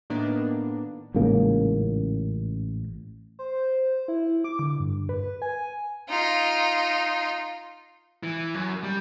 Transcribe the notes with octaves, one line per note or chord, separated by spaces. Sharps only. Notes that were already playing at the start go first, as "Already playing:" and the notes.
A2 D#3 A#3 B3 D4
A1 G#2 C#3 A#3
C5
E4
D6
D3
G2
B4
G#5
D#4 F4
E3
F#2
G3